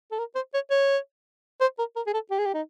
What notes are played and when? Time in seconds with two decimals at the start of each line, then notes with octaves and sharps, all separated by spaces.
0.11 A4
0.18 A#4
0.35 C5
0.54 C#5
0.71 C#5
1.61 C5
1.78 A#4
1.96 A#4
2.06 G#4
2.13 A4
2.31 G4
2.38 G#4
2.45 G4
2.54 D#4